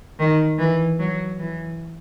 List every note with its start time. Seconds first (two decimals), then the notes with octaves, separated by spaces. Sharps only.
0.19 D#3
0.59 E3
0.99 F#3
1.39 E3